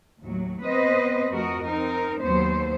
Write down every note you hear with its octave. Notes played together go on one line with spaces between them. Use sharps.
D#2 A2 F#3
B3 C4 B4 C5 D#5
F2 A3 F#4 A#4 D#5
C4 D#4 A#4
D#2 F#3 B3 C5